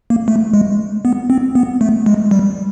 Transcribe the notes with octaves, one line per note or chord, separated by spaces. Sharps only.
A#3
A3
G#3
B3
C4
B3
A3
G#3
G3